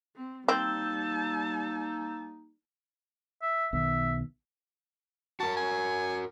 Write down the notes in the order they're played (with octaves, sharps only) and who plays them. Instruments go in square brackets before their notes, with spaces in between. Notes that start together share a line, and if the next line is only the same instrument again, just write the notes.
[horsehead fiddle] C4
[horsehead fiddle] G3 A5 [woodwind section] A#3 D#4 [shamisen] C4 [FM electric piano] E6 G6
[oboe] E5
[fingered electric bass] B1 B2 D#3 [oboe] E5
[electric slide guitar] F#4 A#4 [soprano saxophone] A5
[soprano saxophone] G#5